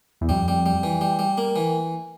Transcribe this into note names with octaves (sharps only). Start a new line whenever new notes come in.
E2
F2 G3
G3
G3
E3
G3
G3
A#3
E3